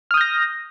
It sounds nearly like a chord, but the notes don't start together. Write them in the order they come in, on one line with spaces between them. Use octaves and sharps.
F6 D#6 G6 A#6